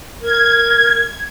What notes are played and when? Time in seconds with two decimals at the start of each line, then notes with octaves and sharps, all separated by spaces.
0.22 A#4 G#6